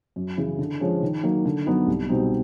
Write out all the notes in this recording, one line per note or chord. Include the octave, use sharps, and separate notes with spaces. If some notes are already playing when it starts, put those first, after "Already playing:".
F#2
C#3 E3
D3
F3 G#3 C#4
D#3
F#3 A#3 D#4
D3
F#3 B3 D#4
C2
B2 G3 C4 D#4